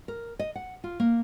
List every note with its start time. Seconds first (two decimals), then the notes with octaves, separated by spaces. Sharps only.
0.08 A#4
0.39 D#5
0.56 F#5
0.84 F4
1.00 A#3